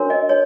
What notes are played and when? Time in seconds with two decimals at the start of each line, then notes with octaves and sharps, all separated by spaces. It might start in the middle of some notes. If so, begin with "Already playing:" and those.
Already playing: D4 F#4 A#4 C#5
0.10 D#5
0.29 C#5